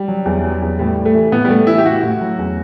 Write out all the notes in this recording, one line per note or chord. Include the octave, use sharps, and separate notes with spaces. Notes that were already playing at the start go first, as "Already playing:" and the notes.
Already playing: G3
F#3
E2
F#3
E2
A2 G3
A2
A3
E3
A2 B3
G3
A2 A3
E3 E4
G4
A2 F#4
A2
F#3
E2